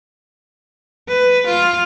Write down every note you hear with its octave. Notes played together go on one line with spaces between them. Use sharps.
B4
F4